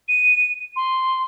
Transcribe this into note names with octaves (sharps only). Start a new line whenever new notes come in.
D#7
C6